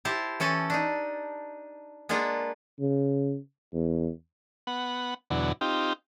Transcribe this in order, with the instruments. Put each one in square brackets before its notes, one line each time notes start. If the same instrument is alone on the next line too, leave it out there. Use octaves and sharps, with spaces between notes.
[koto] E4 G4 C5 A5
E3 C#4 A4 A5
D4 D#4
G#3 A#3 B3 D4 F4
[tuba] C#3
E2
[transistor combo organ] B3 F#5
E2 B2 D3 F#3
C4 D#4 F4 G4